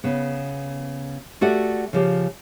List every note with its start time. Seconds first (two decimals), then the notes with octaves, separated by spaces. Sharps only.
0.04 C#3 B3
1.41 A3 F#4 G4 D5 F#5
1.93 C#3 F3 G4